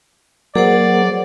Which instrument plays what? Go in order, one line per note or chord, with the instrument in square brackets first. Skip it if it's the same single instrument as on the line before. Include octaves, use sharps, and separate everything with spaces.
[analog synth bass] F#3 [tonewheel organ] A#3 [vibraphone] G#4 C5 F#5 [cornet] D5